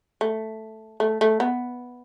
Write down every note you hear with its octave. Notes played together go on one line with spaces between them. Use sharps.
A3
A3
A3
B3